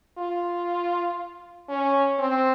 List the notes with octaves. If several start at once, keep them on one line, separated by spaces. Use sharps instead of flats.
F4
C#4
C4